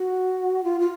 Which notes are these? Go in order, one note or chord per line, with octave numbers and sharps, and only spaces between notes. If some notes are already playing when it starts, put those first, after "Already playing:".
Already playing: F#4
F4
F4